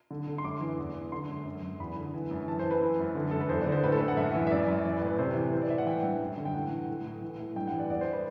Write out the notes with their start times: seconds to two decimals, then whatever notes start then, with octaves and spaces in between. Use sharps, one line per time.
0.11 D3
0.28 D3
0.38 C6
0.44 F#2 D6
0.61 E3
0.78 E2
0.95 E2
1.12 D3 C6
1.29 F#2
1.45 F#2
1.63 F#2
1.80 E2 B5
1.96 D3
2.14 E3
2.31 F#2
2.48 E3 A5
2.59 C5
2.65 E3
2.70 B4
2.81 E3
2.99 F#2
3.15 D3
3.31 F#2 A4
3.41 B4
3.49 E2 C5
3.61 D5
3.66 D3
3.72 C5
3.83 A2 B4
3.92 A4
4.00 A2 B4
4.08 F#5
4.17 F#2 E5
4.34 E3
4.47 E5
4.50 F#2 D5
4.68 F#2
4.85 E3 D5
4.97 B4
5.01 A2
5.07 B4
5.19 C3 C5
5.36 E3
5.53 E3 C5
5.62 D5
5.70 A2 E5
5.78 F#5
5.86 E3 G5
6.03 G2
6.21 F#2
6.38 D3
6.45 G5
6.54 A2 F#5
6.71 E3
6.88 A2
7.05 A2
7.22 E3
7.39 A2
7.56 G2 G5
7.67 F#5
7.73 E3 D5
7.90 E2 D5
8.01 C5
8.12 B4